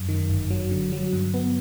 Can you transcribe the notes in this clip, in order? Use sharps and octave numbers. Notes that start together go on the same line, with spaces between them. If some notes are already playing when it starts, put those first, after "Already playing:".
Already playing: F#2
D#3
G1
F#3
D3
F#3
G2
B3